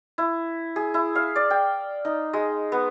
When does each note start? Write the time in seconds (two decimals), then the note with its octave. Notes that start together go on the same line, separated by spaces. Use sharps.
0.18 E4
0.76 G#4
0.94 E4
1.15 F5
1.36 D5
1.50 G5
2.05 D#4
2.33 G#3
2.72 B3